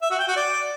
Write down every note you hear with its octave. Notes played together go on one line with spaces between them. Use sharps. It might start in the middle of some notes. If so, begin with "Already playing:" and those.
E5
F#4
G5
F#4
D5